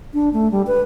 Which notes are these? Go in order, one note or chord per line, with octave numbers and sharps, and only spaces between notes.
D4
A3
G3
B4